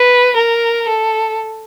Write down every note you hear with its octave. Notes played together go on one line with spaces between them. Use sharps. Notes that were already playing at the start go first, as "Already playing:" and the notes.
Already playing: B4
A#4
A4